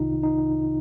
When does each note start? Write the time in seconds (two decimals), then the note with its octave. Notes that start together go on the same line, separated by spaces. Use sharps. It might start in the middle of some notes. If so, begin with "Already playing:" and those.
Already playing: C2 C3 D#3 D#4 F4
0.23 D#4